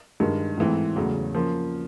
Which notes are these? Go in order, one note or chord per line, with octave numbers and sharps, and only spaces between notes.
G2 D#3 G#3
G#2 E3 A3 C4
E2 C#3 F#3 A3
F3 A#3 C#4